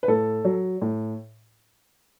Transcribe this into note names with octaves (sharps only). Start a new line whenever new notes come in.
B4
A2 A4
F#3
A2